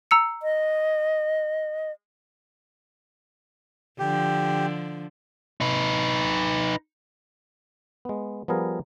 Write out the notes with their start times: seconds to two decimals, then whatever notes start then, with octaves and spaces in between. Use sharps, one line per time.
0.11 A#5 E6 C#7
0.43 D#5
3.99 D3 F3 G4
5.61 D#4 B4
8.05 G#3 B3
8.48 F3 G3 B3 G#4 A#4